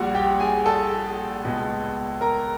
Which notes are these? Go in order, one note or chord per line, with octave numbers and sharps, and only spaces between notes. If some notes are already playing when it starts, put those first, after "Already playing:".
Already playing: A#1 A#2 G3 F#4 F#5
G4 G5
G#4 G#5
A4 A5
C#2 B2 G#3
A#4 A#5